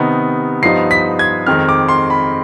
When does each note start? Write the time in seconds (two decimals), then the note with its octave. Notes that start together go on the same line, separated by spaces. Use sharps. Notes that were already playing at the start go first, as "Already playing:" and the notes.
Already playing: C3 D#3 B3 D#4
0.62 G2 F3 B3 D#4 C7
0.91 B6
1.19 G#6
1.46 F2 D#3 G#3 C4 F6
1.69 D6
1.89 C6
2.10 B5